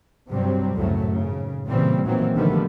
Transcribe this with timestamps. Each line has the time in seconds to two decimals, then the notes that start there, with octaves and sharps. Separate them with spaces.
0.29 G2 C3 F#3 G3 C4
0.75 C#2 F#2 A2 C#3 F#3 A3
1.07 G#1 A2 C#3
1.68 A#2 C#3 E3 G3 C4
2.04 A#2 D#3 E3 F#3 C4
2.36 D3 D#3 F3 G3 A3 B3